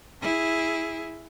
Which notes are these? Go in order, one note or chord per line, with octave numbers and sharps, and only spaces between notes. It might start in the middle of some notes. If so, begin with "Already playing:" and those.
E4 G#4